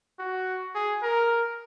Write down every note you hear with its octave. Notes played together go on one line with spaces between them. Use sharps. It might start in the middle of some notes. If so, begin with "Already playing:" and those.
F#4
G#4
A#4